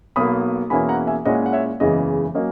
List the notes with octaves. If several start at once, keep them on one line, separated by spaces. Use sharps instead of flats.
B1 B2 A#3 B5 D#6
E2 B2 A#3 C#4 E4 G#5 B5
F#5 A#5
E5 G#5
A#2 G#3 C#4 E4 D#5 F#5
F#5
C#5 E5
F#1 E2 C#3 E3 G#3 D#5
F#3 A#3 C#4 D#5